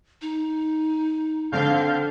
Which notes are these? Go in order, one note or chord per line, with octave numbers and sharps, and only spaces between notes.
D#4
D3 C4 F5 G6